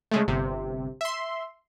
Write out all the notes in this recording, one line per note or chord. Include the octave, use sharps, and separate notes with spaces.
C#3 G#3 A3
G1 C3
E5 C6